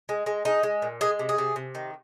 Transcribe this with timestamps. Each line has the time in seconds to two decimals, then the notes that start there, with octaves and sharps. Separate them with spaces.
0.09 G#3
0.26 G#3
0.45 G#3 D#4
0.63 G#3
0.82 A#2
1.01 G#3 G#4
1.19 C3
1.29 G#4
1.38 C3
1.56 C3
1.75 D#3